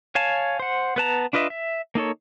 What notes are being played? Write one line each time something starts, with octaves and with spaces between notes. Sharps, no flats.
C#5 F5 G#5 A5
C5 F#5
B3 B4 A5 A#5
D4 F4 B4 D#5 E5
E5
A#3 D#4 A4 C#5